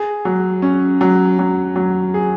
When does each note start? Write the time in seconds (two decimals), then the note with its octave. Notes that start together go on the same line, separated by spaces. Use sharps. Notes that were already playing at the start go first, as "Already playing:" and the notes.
Already playing: G#4
0.25 F#3
0.62 C#4
1.01 F#3
1.39 F#3
1.76 F#3
2.14 G#4